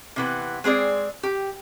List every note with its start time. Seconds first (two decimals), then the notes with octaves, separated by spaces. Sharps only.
0.16 C3 E3 B3
0.64 G#3 C4 G#4 D5
1.23 G4